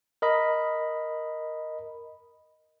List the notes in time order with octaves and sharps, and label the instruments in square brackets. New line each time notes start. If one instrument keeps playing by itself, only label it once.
[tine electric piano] A#4 D#5 B5